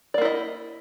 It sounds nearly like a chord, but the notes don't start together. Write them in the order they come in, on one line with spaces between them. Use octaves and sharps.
D5 A#3 E4 D#5